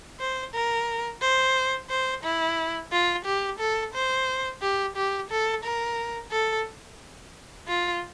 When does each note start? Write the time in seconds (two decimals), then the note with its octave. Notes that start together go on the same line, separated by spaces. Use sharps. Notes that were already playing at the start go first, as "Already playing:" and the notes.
0.20 C5
0.54 A#4
1.22 C5
1.90 C5
2.24 E4
2.92 F4
3.25 G4
3.59 A4
3.94 C5
4.62 G4
4.96 G4
5.31 A4
5.64 A#4
6.32 A4
7.68 F4